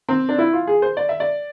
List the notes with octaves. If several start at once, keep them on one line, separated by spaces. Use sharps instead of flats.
C4
D4
E4
F4
G#4
C5
D5
E5
D5